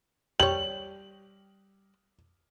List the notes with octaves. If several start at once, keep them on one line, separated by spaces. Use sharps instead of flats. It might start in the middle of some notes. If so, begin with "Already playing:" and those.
G3 C#5 F#7